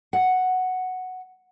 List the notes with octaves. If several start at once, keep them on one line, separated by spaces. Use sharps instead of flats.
F#5